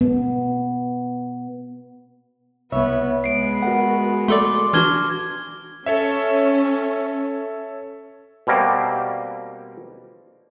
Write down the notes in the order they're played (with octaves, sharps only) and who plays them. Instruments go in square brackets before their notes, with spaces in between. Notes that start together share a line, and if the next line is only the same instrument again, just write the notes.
[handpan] B3
[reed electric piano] C2 C#5 E5 [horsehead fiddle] B3
[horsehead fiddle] G#3 B3 [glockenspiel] C7 D7
[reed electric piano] F#4 A#4 F#5
[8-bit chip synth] A3 A4 D5 [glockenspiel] C6 D6
[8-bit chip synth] E3 D4 F#4 [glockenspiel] F6 G#6 G7
[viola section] C#4 [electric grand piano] A4 C#5 E5
[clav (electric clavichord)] B2 G3 A#3 C4